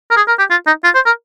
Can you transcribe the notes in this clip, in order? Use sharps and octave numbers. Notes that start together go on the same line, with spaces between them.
A#4
G#4
A#4
G4
F4
D#4
F4
C5
A#4